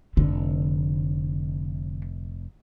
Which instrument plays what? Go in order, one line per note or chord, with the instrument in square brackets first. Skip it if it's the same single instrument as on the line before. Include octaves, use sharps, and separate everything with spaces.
[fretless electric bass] F1 [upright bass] D3